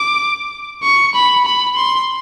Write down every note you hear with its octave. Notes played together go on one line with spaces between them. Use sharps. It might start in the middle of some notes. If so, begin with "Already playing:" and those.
Already playing: D6
C#6
B5
B5
C6